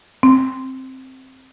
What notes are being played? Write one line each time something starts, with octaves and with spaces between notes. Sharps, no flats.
C4